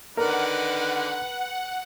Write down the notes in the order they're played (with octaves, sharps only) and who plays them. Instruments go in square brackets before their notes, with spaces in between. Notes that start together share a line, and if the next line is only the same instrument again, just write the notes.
[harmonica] D3 D#3 D5 [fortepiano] A#4 [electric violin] B4 [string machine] F#5